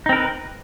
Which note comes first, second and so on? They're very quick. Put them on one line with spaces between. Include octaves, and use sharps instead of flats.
D#4 C4 A#4 B4